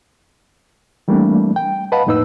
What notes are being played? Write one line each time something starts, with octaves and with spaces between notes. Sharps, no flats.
E3 G3 A3 A#3 C4 D4
G5
B4 D#5 F5 F#5 A5 B5
F2 A2 A#3 D#4 B4 E6